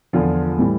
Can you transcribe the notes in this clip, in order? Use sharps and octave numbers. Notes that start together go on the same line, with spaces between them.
E2 D3 F3 F4
A2 E3 G3